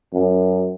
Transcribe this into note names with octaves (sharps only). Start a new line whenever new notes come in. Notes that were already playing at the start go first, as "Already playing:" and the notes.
F#2